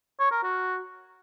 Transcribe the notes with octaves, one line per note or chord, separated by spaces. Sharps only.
C#5
A#4
F#4